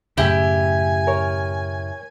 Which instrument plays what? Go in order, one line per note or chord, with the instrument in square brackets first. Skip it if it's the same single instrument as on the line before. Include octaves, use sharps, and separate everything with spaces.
[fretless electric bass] F#2 A2 C#3 [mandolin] E4 G4 [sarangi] G#5
[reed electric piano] A#4 C#5